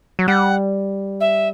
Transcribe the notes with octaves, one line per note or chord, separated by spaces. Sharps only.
F#3
G3 F#5
E5